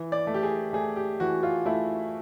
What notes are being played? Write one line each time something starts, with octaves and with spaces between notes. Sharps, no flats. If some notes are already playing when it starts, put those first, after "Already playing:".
Already playing: E3
D5
A3
G4
G#4
A3 G#4
G4
E3 F#4
F4
A3 E4